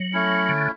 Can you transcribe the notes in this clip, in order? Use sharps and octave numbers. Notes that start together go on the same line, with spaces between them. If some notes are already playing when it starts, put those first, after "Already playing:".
Already playing: F#3
A3 C#4 E4
D3